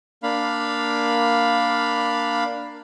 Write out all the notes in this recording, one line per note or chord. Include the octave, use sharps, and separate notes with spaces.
A#3 D4 F5 B5